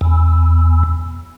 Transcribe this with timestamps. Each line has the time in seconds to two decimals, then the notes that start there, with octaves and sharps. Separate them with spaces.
0.01 E2